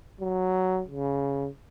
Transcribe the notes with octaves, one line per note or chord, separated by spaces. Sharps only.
F#3
C#3